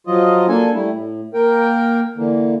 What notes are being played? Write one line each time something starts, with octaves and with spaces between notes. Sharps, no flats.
F3 F#3 F4 D#5
A#3 D4 A4 G#5
G3 A3 E4
A2
A#3 A#4 G5
D3 E3 A#3